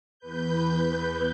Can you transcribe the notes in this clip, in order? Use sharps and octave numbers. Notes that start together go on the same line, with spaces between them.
E2 B4 G6